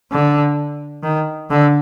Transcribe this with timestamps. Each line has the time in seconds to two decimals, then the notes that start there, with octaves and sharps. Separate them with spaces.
0.12 D3
1.03 D#3
1.50 D3